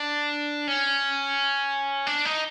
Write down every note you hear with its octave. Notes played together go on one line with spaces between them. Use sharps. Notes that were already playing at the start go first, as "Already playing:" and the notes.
Already playing: D4
C#4
D4
D#4